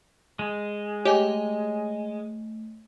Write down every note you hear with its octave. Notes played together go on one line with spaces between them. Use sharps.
G#3
A3 G4 C#5 D#5 G#5